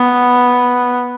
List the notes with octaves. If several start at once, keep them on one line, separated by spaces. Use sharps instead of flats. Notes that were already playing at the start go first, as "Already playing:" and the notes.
Already playing: B3